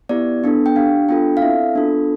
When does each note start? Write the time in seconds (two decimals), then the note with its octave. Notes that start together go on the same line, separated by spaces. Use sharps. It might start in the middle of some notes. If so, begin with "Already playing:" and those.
0.09 B3 E4 G4 D5
0.44 B3 D4 A4
0.66 G5
0.76 D4 G4 F5
1.09 B3 D4 F4 A4 G5
1.37 F5
1.42 C4 E4 A4 E5
1.75 B3 D4 F4 A4